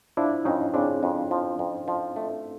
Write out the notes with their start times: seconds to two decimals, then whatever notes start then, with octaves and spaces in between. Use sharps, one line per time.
0.17 F3 D4 E4
0.45 F2 C#4 D#4
0.74 C#3 C4 D4
1.03 F2
1.31 F3
1.59 F2
1.88 F3
2.16 A3